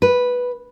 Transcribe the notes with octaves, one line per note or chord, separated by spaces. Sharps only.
B4